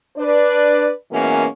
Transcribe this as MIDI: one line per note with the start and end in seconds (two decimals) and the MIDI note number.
0.17 0.92 62
0.17 0.92 71
0.17 0.92 74
1.12 1.45 42
1.12 1.45 47
1.12 1.45 52
1.12 1.45 56
1.12 1.45 58
1.12 1.45 61